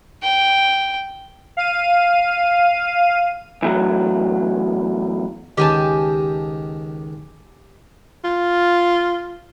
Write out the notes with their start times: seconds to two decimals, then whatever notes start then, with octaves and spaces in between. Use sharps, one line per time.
0.23 G5
1.57 F5 D#7
3.62 E2 A2 F#3
5.57 C#2 D#3 G4 G#5 A5
8.24 F4